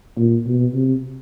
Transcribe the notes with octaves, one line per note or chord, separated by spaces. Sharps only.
A#2
B2
C3